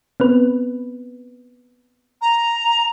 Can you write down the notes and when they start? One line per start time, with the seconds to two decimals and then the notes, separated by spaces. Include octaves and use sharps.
0.20 B3 C4 B4
2.21 A#5